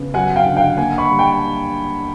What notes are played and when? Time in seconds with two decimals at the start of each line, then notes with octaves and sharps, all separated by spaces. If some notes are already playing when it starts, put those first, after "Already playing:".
Already playing: C#3 B3
0.14 F#3 F#5 G#5
0.36 F5 G5
0.46 D3
0.57 F5 G5
0.77 A#3 F#5 G#5
0.98 B5 C#6
1.09 G3
1.19 G5 A5